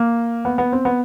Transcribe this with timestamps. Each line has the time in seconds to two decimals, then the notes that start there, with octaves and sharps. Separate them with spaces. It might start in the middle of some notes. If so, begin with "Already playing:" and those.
Already playing: A#3
0.45 B3
0.58 B3
0.73 C4
0.85 B3